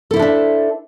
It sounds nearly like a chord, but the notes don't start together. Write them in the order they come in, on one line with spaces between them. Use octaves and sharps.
A4 E4 C5 D4 E5